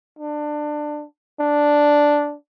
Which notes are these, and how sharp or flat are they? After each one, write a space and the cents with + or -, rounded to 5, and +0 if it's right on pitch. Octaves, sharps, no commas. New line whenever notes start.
D4 +20
D4 +0